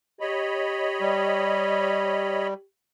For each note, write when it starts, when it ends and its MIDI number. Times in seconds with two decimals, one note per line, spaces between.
0.20 2.64 67
0.20 2.48 73
0.20 2.48 75
0.20 2.48 83
1.01 2.54 55